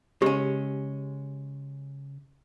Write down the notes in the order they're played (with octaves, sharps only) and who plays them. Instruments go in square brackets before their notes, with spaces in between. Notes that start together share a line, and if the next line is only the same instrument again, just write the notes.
[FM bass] C#3 [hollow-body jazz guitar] G#3 C#4 [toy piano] G4